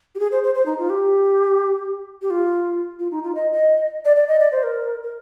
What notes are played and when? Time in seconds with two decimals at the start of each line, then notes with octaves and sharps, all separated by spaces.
0.15 G4
0.19 G#4
0.32 C5
0.43 C5
0.55 C5
0.66 D#4
0.79 F4
0.90 G4
2.22 G4
2.30 F4
3.00 F4
3.11 D#4
3.23 F4
3.35 D#5
3.52 D#5
4.05 D5
4.16 D5
4.28 D#5
4.40 D5
4.52 C5
4.63 A#4
5.03 A#4